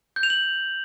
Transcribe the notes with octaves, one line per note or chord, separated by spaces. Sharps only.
G6
F7
F#7